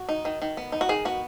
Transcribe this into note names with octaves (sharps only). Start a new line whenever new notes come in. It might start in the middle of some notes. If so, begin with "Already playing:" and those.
Already playing: F#4
D#4
D#3
D#3
B3
D#4
F#4
D#3 G#4
B3 F#4